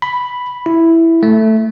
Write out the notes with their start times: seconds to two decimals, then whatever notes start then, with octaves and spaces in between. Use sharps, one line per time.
0.02 B5
0.66 E4
1.23 A3